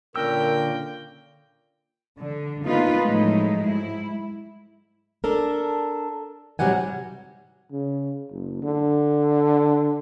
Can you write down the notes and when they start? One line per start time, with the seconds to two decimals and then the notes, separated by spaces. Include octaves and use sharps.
0.16 A#2 D3 C#4 A#4 G5 E6
2.18 D3
2.65 A#3 B3 D#4 F4 B4
3.01 A2 F3 F#3 G#3 A3 D#4
3.64 G#2 E4
5.24 D4 A4 A#4
6.59 G#2 C3 F#3 G3 F#5 G#5
7.72 C#3
8.32 F#1
8.62 D3